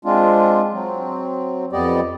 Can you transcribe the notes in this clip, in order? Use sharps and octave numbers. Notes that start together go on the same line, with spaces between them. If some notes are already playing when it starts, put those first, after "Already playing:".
G#3 C4 D4 F4
F#3 C4
F2 B3 G4 D5 D#5